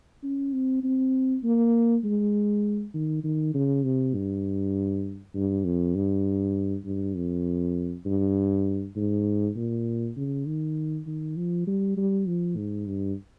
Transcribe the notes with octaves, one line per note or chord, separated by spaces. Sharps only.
C#4
C4
C4
A#3
G#3
D#3
D#3
C#3
C3
G2
G2
F2
G2
G2
F2
G2
G#2
A#2
C#3
D#3
D#3
F3
G3
G3
F3
G#2
G2